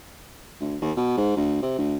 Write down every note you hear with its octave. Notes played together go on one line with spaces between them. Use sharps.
D2
D#2
B2
G#2
D2
C3
D2